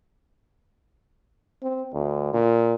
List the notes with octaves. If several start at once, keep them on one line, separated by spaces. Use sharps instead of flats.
C4
D2
A#2